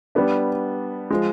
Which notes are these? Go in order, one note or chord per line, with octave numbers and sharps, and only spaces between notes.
G3 B3 D4
F3 G#3